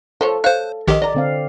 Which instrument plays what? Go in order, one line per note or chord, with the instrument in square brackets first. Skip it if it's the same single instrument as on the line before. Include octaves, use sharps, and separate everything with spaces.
[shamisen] F3 C5 C#5 [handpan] A4
[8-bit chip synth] C5 F#6 [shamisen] C#5 F5
[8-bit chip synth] A#1 D#3 G4 [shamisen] A4 C#5 D#5
[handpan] D5 [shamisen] D#5 A#5
[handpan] D3 C4 F5